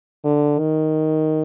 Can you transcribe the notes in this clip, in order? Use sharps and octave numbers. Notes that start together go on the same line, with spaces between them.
D3
D#3